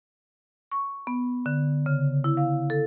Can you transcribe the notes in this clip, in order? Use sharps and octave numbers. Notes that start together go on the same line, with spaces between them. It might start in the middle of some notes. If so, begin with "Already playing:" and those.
C#6
B3
D3
C#3
E4
F5
A4